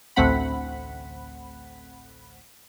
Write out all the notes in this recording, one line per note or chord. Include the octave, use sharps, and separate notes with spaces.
A1 D2 A3 C4 F#5 B5